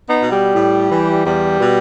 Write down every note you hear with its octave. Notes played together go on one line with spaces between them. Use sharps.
B3 D#4
B2
G3
A2
E3
E2 G3
B2